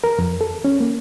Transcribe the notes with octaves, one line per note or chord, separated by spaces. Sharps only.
A#4
F2
A4
C#4
A#3